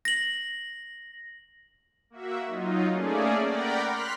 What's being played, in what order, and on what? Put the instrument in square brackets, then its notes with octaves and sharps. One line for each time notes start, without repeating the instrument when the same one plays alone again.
[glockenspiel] A#6 F#7
[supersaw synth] A#3 F#4 E5
F#3 D#4 F4
A3 A#3 C#4 G#4 D5
A#4 D5 F#5 G5 A#5 B5
C6 F6 F#6 B6